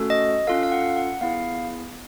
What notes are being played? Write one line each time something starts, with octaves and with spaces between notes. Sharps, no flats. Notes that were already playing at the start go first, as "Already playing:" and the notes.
Already playing: A3 C#4 F#4 A4
D#5
C#4 F4 A4 F5
F5
F#5
F#5
B3 E4 G#4 F5